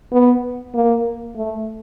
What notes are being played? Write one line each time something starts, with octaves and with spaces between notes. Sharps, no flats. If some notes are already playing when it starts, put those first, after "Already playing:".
B3
A#3
A3